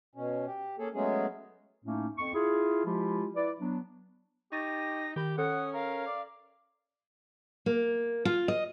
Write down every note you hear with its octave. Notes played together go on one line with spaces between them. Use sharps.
B2 C#4
G4
A#3 C#4 G#4 A4
F#3 G#3 A3 B3 C#4 G#4
A2 A3 A#3 C#4 D#4
F2 C#6
E4 F4 G#4
F3 G#3 E4 F4 G4
E4 B4 D5
F#3 B3 D4
D#4 G4 C#6 A6 A#6 D#7
D#3 G4 B5 G6
C#4 A4 F#5 D#6
A#4 F5
D5
A#3
F4
D#5